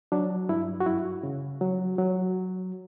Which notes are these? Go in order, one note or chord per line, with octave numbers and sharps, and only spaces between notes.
F#3 D4
G2 E4
F#4
F#2 E4
C#3
F#3
F#3